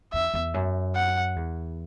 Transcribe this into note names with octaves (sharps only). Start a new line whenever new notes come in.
E2 E5
E2
F#2
F#5
E2